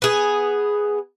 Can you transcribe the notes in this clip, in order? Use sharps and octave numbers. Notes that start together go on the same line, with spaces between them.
B3 G#4